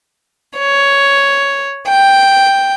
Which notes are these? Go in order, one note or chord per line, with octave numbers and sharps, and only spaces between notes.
C#5
G5